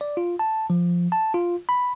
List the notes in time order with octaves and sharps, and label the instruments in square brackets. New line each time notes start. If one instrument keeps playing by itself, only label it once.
[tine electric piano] D5
F4
A5
F3
A5
F4
B5